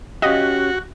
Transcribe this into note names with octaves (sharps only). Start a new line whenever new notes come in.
C#4 F#4 G4 D#5 F5